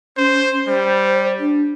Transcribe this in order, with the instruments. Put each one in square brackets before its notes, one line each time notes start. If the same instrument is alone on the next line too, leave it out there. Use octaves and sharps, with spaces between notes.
[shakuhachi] C#4 [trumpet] C5
[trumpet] G3 [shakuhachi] C5
[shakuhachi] D4